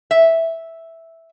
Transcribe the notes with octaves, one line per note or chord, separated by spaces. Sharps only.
E5